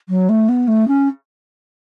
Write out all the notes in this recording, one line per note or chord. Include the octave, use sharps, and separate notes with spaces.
F#3
A3
B3
A3
C#4